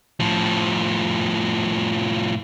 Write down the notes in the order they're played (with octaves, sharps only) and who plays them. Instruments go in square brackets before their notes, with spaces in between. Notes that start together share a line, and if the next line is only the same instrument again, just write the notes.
[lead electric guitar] A2 F3